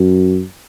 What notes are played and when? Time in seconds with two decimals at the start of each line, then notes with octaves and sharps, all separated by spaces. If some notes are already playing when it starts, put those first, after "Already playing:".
Already playing: F#2